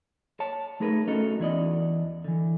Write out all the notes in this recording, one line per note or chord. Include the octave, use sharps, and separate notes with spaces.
C#5 A5
A3 D#4 G#4 A#4 B4
A3 C#4 D#4 F#4 A4
E2 E4 D5 D#5
D3 E3